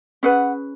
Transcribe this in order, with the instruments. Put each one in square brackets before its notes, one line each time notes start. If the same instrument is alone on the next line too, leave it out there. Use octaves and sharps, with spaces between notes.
[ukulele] C#4 G#4 B4 F#5